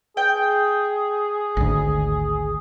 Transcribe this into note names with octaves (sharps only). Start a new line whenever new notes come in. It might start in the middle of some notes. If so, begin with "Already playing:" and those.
G#4 G5
G#1 D2